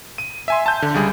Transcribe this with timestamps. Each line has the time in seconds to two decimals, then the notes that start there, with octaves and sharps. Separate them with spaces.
0.18 D#7
0.48 E5 G#5 C6
0.66 A5 G6
0.82 D3
0.94 C#2 G3 G#4